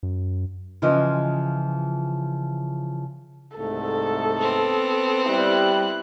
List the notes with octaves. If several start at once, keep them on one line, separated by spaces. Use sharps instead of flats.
F#2
C#3 E3 F3 F4 D#5
C2 G#2 A3 A4
B3 C4
G3 E4 F#6